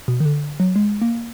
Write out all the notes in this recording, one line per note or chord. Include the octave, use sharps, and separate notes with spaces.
B2
D#3
D3
F#3
G#3
A#3